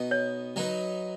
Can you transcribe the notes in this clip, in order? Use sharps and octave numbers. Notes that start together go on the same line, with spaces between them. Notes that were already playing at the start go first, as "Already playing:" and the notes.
Already playing: B2 B3 D#4 B4
C#5
F#3 D#4 B4